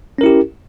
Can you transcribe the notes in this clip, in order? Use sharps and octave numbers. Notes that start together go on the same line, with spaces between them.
C#4 E4 G4 A#4